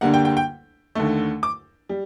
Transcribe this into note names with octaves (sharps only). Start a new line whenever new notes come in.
D2 D3 G3 A#3 F#5
G5
G5
G5
D#2 D3 A3
D6
G3